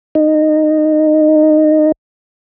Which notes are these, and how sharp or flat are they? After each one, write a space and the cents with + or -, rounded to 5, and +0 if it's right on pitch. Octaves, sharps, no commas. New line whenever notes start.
D#4 -15